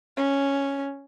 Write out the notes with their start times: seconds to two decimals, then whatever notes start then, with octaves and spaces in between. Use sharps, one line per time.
0.17 C#4